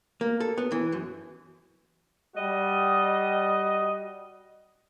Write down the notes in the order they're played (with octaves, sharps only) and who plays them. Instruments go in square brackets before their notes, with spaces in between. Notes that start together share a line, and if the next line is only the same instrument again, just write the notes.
[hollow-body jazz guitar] A#3
A4
B3
E3
F#2
[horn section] G3 F#4 D#5